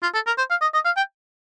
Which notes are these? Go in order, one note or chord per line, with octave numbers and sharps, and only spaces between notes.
F4
A4
A#4
C5
F5
D#5
D#5
F5
G5